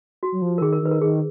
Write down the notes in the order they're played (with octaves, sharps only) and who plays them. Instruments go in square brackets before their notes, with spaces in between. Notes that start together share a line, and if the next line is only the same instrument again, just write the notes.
[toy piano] F#4
[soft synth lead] F#3
F3
[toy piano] A#4
[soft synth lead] D#3 [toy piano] G#4
[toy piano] A#4
[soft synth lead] D#3 [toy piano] B4
[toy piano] A#4
[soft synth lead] D#3 [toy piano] G#4